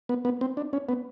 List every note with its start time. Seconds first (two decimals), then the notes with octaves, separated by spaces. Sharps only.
0.09 B3
0.25 B3
0.41 C4
0.57 D4
0.73 C#4
0.89 B3